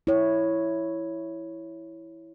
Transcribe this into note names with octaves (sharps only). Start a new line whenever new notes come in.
E4 C#5